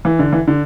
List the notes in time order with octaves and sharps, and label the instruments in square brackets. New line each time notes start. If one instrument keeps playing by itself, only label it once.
[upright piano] E3
D3
E3
D3